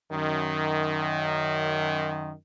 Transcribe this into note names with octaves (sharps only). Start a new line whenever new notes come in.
F#2 D#3